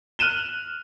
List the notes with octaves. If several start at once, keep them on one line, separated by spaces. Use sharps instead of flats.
F6 F#6 D#7 E7 G7